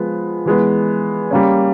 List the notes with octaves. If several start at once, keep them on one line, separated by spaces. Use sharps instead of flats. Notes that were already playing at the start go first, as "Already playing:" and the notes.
Already playing: F3 G#3 B3
E3 G#3 B3
G3 A#3 C#4